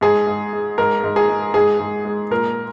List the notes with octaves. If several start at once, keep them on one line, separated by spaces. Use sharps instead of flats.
G#2 G#4
G#2
G#3
G#2 A#4
G#2
G#4
G#3
G#2 G#4
G#2
G#3
A#2 A#4